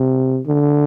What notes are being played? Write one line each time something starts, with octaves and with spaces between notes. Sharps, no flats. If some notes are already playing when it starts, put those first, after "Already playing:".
Already playing: C3
D3